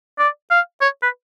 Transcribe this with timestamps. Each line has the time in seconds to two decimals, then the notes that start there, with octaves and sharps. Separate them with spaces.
0.19 D5
0.50 F5
0.81 C#5
1.02 B4